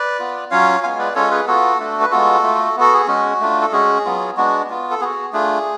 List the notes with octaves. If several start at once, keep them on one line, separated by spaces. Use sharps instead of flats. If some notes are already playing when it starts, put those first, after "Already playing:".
Already playing: B4 D5
B3 F4
F#3 C#4 F4 C#5 F5
G#3 B3 F4 F5 G#5
B4 D5
G#3 C#4 F4 A4 C#5
G#4 B4
B3 F4 F#4 A4
A3 D4 F#4
B4
G#3 B3 F4 F#4 A4
A3 F4
B3 F#4 A4
G#4
G#3 C#4 F#4
A3 D4 F4
A4
G#3 C#4 F#4 G#4
F#3 B3 F4
G#3 B3 D4 F#4
B3 F4
A4
B3 F#4 G#4
A3 D4 F4 G#4